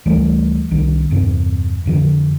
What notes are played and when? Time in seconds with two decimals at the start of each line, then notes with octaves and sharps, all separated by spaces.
0.06 D2 E3 G3 A3
0.71 C2 D#3
1.11 E2 G2 C3 C4
1.86 F2 D3 F3